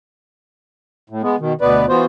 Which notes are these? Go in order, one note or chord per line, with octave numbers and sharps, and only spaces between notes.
A2
G#3 B3
B2 D#3
D2 B2 B3 B4 D5
E3 B3 F4 F#4 C5